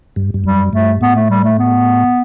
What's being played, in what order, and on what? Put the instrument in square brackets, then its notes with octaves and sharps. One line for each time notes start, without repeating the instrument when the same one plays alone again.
[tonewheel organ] G2
G2
[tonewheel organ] F#2 [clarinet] G3
[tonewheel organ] G2 [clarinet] A3
[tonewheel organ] A2 [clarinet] B3
[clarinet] A3
G3
A3
B3